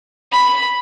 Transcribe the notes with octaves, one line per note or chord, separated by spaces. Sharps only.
B5